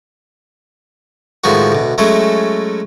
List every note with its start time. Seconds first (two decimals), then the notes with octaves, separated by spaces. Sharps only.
1.44 A2 D#3 F3 G#3 F#4
1.72 D2 B2
1.98 F#3 G#3 A3 C#4 E4 A4